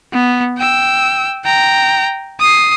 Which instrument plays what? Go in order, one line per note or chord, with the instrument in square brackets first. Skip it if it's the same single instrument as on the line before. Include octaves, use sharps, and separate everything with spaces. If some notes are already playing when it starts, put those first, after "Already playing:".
[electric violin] B3
G5 E6
G5 A#5
D#6 C7